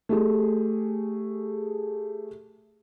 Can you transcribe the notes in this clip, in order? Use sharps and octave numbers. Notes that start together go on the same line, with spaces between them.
A3 G4 G#4